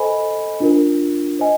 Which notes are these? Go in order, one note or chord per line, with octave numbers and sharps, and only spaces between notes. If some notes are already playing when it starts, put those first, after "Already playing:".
Already playing: A4 C5 D#5 G#5 B5
D4 F4 A#4
C5 D#5 G#5